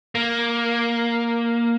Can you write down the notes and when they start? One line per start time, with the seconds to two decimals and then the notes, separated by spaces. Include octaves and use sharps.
0.15 A#3